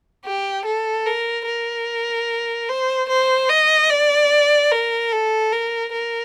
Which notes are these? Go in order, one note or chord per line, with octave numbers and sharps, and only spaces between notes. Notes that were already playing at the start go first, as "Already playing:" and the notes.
G4
A4
A#4
A#4
C5
C5
D#5
D5
A#4
A4
A#4
A#4